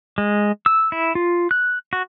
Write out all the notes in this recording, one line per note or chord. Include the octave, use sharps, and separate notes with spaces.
G#3
E6
E4
F4
F#6
F#4